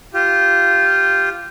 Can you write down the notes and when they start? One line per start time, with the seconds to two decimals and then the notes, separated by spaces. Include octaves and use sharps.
0.14 F4 G4